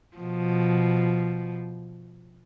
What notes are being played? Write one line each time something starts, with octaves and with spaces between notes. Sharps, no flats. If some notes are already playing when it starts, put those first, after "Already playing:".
B2 F3